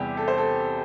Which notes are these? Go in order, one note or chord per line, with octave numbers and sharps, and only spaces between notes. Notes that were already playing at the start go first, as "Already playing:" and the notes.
Already playing: E2 C3 G3 G4
A4
C5
A4